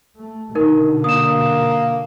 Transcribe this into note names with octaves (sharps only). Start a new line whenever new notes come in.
A3
B2 D3 D#4 A#4
A#3 D#6 E7